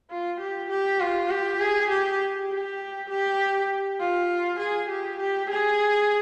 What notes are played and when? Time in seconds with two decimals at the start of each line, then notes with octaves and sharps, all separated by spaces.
0.10 F4
0.40 G4
0.70 G4
1.00 F4
1.30 G4
1.60 G#4
1.90 G4
2.50 G4
3.09 G4
4.00 F4
4.59 G#4
4.89 G4
5.19 G4
5.50 G#4